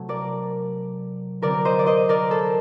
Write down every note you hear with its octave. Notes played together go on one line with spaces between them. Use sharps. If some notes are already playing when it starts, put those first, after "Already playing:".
Already playing: C3 F#3 A3
A#4 D5
D3 F#3 C4 A#4 D5
C5 D#5
D5
C5 D#5
A#4 D5
A4 C5